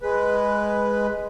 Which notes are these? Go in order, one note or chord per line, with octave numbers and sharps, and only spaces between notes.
G#3 B4